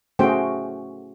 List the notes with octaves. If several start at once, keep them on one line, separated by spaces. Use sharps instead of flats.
A3 C#4 F#4 G#4 C5 G5